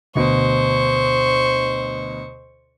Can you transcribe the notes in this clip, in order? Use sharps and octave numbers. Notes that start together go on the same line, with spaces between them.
D2 B2 C5 C#6